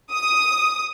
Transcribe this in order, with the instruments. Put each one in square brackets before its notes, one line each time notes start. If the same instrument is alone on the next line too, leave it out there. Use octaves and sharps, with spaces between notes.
[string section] D#6